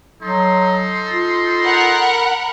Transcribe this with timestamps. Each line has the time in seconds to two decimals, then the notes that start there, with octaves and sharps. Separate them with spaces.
0.22 F#3 D#4 A4 C6
1.10 F4
1.61 A#4 F#5 B5